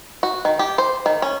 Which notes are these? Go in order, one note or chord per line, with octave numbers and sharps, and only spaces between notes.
F#4
D#3
G4
C5
D#3
C#4